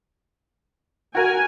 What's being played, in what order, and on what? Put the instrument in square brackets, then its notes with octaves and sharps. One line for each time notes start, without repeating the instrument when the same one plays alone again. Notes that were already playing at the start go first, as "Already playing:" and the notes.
[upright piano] F#4 A#4 [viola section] G#5